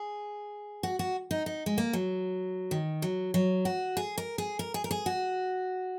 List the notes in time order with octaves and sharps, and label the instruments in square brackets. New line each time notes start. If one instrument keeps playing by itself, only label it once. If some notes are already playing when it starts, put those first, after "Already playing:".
Already playing: [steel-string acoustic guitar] G#4
F#4
F#4
D#4
D#4
G#3
A#3
F#3
D#3
F#3
F#3
F#4
G#4
A#4
G#4
A#4
G#4
A#4
G#4
F#4